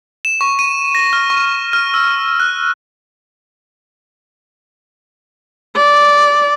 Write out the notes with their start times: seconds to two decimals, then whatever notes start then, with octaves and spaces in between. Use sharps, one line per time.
0.25 E7
0.41 C#6
0.59 D#7
0.95 A#6
1.13 F6
1.30 C#6
1.73 F6
1.94 E6
2.40 F#6
5.76 D5